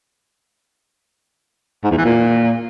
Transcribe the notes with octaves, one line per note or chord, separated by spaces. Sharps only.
G#2
E2
E3
A#2